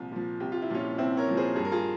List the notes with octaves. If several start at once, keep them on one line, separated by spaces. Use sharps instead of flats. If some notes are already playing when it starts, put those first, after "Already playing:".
Already playing: C2 A#2 F3
A#2 F3
C2 G4
F4
E4
A#2 F3 C#4 F4
C2 C4 E4
A#4 C#5
A#2 F3
G#4 C5
G2 G#4
A#4
F4 G#4